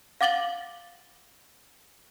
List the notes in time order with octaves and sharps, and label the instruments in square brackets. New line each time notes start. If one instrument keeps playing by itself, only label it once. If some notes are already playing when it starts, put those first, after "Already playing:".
[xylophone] F5 F#5 D6 A6 F#7 G7